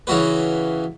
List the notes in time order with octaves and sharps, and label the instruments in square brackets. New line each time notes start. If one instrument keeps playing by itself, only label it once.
[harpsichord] C#3 E3 F#4 B4